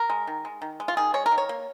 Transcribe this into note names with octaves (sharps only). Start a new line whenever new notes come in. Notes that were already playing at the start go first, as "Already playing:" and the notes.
Already playing: A#4
G#3
D#3
G#3
D#3
G#3
F4
D#3 G#4
G#3 C#5
A#4
D#3
C#5
A#3